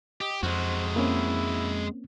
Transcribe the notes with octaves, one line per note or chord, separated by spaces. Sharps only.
G4 D#5
F2 G#3 F#4 C5
A#3 C4 C#4 E4